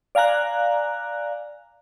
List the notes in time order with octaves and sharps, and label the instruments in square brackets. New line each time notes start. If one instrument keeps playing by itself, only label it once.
[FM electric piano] D5 F5 G#5 A#5 F#6